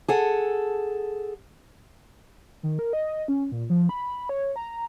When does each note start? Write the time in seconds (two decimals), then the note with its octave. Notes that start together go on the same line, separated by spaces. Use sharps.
0.08 G#4 A4 F#5
2.63 D#3
2.79 A#4
2.93 D#5
3.28 C#4
3.52 A#2
3.70 F3
3.89 B5
4.29 C#5
4.56 A#5